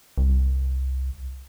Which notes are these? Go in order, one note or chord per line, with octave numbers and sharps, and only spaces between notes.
C2